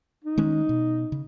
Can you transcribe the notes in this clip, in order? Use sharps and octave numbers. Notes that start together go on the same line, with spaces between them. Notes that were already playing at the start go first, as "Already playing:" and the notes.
D#4
D#3 G#3 C#4
B2
C#3